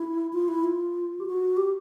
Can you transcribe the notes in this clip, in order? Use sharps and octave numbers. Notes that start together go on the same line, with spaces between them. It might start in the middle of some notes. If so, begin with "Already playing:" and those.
Already playing: E4
F4
E4
F4
G4
F#4
G4